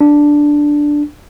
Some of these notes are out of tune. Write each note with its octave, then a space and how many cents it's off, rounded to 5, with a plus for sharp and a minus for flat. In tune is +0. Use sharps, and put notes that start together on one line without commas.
D4 +0